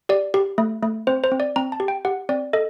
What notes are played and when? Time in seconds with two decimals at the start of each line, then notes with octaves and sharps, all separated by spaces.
0.09 G4 D5
0.34 G4
0.58 A3
0.83 A3
1.07 C4 C5
1.24 C5
1.32 C4
1.40 D5
1.56 C4 A#5
1.72 A5
1.80 G4
1.88 G5
2.05 G4 F#5
2.29 C4 D5
2.53 A4 D#5